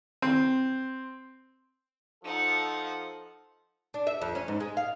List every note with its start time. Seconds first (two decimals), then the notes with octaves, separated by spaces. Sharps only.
0.22 C4
2.24 F3 D#4 A4 F#5
3.94 D4
4.07 E5
4.21 F2
4.35 C#4
4.48 G#2
4.60 G#3
4.77 F5